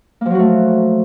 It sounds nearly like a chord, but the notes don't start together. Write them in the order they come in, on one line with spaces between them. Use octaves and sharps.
A#3 F3 F#3 F#4 A3